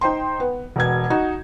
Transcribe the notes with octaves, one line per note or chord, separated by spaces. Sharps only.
D#4 C5 G5 C6
B3
E1 B2 G#6
D#4 F#4